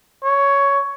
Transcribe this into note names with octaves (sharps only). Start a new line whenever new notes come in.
C#5